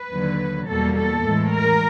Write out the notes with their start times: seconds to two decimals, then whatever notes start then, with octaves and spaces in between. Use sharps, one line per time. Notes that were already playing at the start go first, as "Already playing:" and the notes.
Already playing: B4
0.11 D#2 D3 F#3
0.67 E2 B2 G3 A#3 A4
0.96 A4
1.24 A2 E3 G#3
1.52 A#4